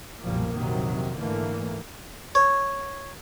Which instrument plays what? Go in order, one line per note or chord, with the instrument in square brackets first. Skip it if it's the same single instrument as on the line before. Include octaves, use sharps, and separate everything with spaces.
[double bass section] F#1 B1 A#2 F3 G3 A#3
A#1 F2 C3 D#3 F#3
G#2 D3 E3 A3 A#3
[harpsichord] C#5